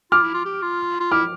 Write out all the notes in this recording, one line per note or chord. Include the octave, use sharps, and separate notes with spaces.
F4 D6 F6
E4
F4
G4
F4
F4
E4 D6 F6